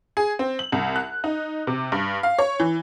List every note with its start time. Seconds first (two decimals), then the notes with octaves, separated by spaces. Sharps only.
0.17 G#4
0.39 C4
0.59 F#7
0.72 C2
0.96 F#6
1.24 D#4
1.67 C3
1.92 G2
2.23 F5
2.39 C#5
2.60 E3